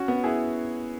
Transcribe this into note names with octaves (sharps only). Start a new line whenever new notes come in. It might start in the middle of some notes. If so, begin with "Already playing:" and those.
Already playing: C#4 F#4
B3
E4 G#4